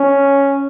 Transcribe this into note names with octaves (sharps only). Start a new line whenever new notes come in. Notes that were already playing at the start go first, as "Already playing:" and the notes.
Already playing: C#4